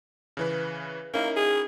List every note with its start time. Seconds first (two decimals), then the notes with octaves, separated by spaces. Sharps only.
0.37 C#3 E3 B4
1.14 A#3 C#4 D#4 E4
1.36 G#4